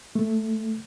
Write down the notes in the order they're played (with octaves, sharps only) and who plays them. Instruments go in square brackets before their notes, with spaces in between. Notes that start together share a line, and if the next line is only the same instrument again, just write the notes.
[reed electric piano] A3